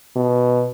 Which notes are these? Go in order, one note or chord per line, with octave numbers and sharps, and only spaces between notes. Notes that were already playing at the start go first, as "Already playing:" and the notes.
B2